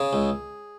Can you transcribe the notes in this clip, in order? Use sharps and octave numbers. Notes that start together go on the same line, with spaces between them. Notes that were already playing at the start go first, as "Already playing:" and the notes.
Already playing: C#3 G#4
C#2